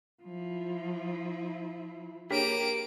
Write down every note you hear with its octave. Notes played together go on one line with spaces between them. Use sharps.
F3 E4
A#3 D4 G4 G#4 C#5 D7